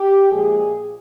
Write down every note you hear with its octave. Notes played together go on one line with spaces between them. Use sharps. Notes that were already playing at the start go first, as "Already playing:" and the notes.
Already playing: G4
A#2 F3 G#3 G#4